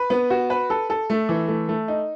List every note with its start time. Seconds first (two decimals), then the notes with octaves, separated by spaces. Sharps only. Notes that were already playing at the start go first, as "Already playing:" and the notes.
Already playing: B4
0.10 B3
0.30 F#4
0.50 B4
0.70 A4
0.90 A4
1.10 A3
1.29 E3
1.48 A3
1.69 A3
1.88 D#4